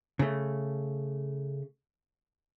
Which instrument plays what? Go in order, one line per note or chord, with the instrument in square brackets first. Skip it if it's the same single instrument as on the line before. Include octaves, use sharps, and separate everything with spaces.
[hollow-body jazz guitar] C#3 A3